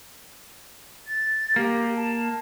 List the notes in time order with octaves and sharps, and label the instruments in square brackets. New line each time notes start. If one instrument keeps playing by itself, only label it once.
[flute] A6
[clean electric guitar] A#3 [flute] G4
[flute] A5